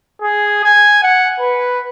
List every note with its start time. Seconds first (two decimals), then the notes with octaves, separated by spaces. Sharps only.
0.22 G#4
0.64 G#5
1.03 F#5
1.40 B4